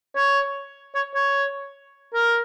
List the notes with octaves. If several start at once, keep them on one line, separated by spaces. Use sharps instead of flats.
C#5
C#5
C#5
A#4